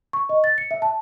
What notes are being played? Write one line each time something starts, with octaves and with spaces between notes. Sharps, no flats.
C#6
D#5
A6
C#7
E5
A5